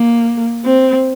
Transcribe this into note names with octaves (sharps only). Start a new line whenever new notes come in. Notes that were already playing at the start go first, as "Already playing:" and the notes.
Already playing: A#3
C4